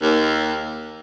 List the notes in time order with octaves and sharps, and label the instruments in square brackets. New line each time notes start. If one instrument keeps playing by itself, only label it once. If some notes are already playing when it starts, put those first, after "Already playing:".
[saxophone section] D#2